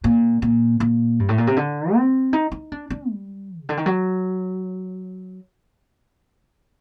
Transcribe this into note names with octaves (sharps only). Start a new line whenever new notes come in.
A#2
A#2
A#2
G2
A2
A#2
C3
D3
C4
D#4
D#4
D4
D4
G3
C3
D3
D#3
F#3